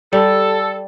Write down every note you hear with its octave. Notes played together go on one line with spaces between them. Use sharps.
G3 A4